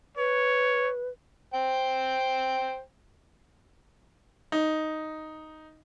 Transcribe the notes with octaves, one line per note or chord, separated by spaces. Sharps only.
B4 C#5
C5 G5
D#4